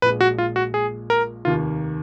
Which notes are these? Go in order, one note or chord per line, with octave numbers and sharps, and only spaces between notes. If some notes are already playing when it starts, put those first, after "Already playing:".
A#1 A#2 G#3 B4
F#4
F4
F#4
G#4
A#4
F1 D#2 D#3 A#3 F4